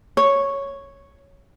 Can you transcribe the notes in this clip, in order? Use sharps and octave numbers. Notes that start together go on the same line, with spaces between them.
C#5